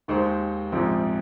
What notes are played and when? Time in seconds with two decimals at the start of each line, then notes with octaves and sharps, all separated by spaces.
0.08 D#2 D#3 G#3 D#4 C5
0.72 A#1 G#2 F3 C4